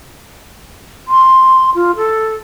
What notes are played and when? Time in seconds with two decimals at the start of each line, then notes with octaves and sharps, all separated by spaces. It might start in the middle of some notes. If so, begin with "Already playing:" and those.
1.08 C6
1.75 F4
1.96 A4